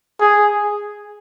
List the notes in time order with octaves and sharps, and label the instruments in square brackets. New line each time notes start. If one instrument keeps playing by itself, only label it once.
[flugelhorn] G#4